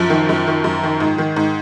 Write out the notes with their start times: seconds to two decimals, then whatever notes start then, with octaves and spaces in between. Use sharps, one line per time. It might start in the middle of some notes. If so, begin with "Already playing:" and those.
Already playing: F#2 F3
0.10 D#3
0.29 F#2
0.47 D#3
0.64 F#2
0.83 D#3
1.00 G#2
1.18 D#3
1.36 G#2